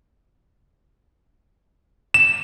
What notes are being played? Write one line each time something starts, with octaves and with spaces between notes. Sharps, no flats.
E7